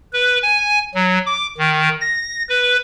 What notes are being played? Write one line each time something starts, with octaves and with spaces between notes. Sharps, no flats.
B4
G#5
F#3
D6
D#3
A#6
B4